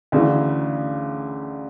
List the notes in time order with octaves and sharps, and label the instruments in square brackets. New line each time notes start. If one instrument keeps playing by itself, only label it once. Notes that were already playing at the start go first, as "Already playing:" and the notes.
[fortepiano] D2 C#3 E3